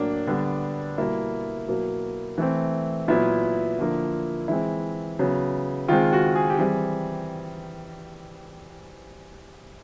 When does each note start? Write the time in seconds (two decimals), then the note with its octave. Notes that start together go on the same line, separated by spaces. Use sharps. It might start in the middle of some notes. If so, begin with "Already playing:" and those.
Already playing: A2 F#3 A#3 D4
0.27 D3 G3 B3
0.98 B2 G3 A#3 E4
1.68 B2 F#3 A#3
2.38 E3 A3 C4
3.08 A#2 F#3 B3 E4
3.79 D3 F3 A#3
4.48 E3 G#3 C4 E4
5.19 C#3 F#3 B3
5.88 D#3 G#3 C4 F4
6.13 F#4
6.36 G#4
6.50 G4
6.59 E3 G3 C4 G#4